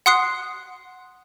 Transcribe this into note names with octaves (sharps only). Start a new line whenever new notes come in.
F#5 C6 D#6 F#6 C7